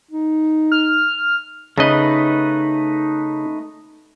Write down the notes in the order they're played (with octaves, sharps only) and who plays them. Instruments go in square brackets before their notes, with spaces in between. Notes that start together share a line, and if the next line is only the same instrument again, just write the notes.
[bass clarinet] D#4
[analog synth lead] F6
[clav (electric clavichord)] C#3 D#5 [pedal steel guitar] A3 D#4 B4